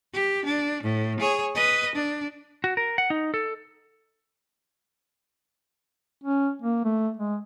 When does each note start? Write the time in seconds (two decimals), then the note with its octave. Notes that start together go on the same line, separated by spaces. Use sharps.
0.13 G4
0.45 D4
0.83 A2
1.20 G#4 C#5
1.55 B4 D#5
1.95 D4
2.64 F#4
2.77 A#4
2.98 F#5
3.10 D#4
3.34 A4
6.24 C#4
6.62 A#3
6.85 A3
7.17 G#3